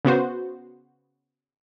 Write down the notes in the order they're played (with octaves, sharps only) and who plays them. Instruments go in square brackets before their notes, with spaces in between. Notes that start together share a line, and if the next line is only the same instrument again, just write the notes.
[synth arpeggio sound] C#3 B3 F#4 C5